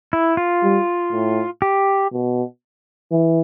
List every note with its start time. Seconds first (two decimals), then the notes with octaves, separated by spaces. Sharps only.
0.13 E4
0.37 F4
0.63 G3
1.12 A2
1.62 G4
2.13 B2
3.11 E3